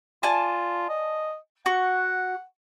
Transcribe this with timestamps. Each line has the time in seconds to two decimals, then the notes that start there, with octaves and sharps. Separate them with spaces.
0.23 F4 D5 G#5 A5
0.89 D#5
1.66 F#4 F#5 C#6